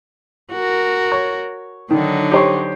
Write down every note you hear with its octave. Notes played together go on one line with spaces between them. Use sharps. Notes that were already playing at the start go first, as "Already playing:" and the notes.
F#4 A#4
C#5
D3 D#3 F#3 D#4
G4 C5 C#5